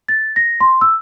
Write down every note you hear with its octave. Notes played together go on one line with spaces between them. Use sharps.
A6
A#6
C6
E6